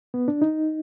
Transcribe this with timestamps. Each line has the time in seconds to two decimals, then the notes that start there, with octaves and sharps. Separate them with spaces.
0.14 B3
0.28 D4
0.42 D#4